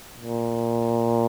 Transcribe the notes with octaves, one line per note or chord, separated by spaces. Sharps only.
A#2